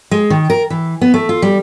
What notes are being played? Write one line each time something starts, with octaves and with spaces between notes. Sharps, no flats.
G#3
D#3
A#4
E3
B3
A3
F4
G3